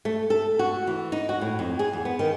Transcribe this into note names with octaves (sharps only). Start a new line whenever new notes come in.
A3
A4
F#4
E3
D#4
F#4
A2
F2
G#4
E2
B3
D#3